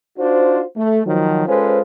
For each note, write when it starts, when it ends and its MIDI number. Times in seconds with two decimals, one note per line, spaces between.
0.19 0.63 62
0.19 0.63 63
0.19 0.63 65
0.19 0.63 66
0.19 0.63 72
0.77 1.01 57
1.06 1.46 51
1.06 1.46 53
1.06 1.46 54
1.47 1.80 56
1.47 1.80 61
1.47 1.80 65
1.47 1.80 69
1.47 1.80 71
1.47 1.80 72